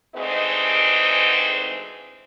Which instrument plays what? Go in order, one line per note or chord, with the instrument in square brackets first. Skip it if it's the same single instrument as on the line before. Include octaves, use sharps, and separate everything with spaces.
[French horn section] D2 E3 G#3 C4 D#4